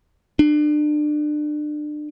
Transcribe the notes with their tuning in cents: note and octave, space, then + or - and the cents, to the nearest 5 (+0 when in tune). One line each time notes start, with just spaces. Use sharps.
D4 +30